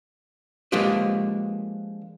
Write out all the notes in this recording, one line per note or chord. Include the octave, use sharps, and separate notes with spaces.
F3 G#3 A#3 D4 G4 B4